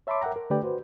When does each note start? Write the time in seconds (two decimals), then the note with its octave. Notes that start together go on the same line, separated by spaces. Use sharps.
0.07 C#5 E5 A5 B5 C6 D6
0.21 A#4 E5 F#5 G5 A#5
0.36 A#4
0.50 D3 A3 G4 B4 D5 G5
0.63 F#4 B4 C5